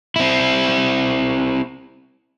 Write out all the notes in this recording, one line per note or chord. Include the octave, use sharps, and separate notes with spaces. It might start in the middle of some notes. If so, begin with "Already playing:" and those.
C4 E4